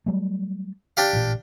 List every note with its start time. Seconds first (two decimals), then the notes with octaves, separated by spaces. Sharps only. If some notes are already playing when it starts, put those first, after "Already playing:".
0.06 F#3 G3 A3
0.97 D4 G4 F5
1.13 A1 A#2